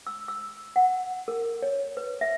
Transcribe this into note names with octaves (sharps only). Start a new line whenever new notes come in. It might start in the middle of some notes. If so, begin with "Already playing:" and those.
E6
E6
F#5
A#4
C#5
B4
E5